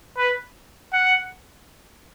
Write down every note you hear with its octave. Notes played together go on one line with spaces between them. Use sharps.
B4
F#5